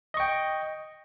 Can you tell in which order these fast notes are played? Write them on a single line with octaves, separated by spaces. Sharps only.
D#5 C#6 G5